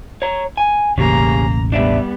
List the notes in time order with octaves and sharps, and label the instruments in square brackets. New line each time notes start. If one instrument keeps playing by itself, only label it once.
[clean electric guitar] C#5 A#5
G#5
[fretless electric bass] E1 A1 C#3 [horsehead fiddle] A#3 A#5 [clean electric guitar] C#4 G4 G#4
[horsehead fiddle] G3 B3 [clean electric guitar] D4 D5 E5